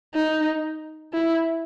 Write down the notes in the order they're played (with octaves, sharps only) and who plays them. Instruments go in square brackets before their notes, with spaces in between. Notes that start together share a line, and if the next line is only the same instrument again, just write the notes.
[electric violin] D#4
E4